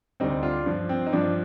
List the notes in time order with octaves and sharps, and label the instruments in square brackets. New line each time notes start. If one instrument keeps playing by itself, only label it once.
[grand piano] D2 D3 G3 C4 D#4
D4 F4
G2 F3
C4
D#4
G2 F3 D4